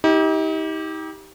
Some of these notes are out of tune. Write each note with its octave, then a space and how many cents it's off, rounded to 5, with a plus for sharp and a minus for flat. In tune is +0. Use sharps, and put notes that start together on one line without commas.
D#4 +40 G4 +0